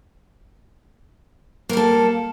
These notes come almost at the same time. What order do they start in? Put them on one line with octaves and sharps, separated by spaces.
A#3 G3 A4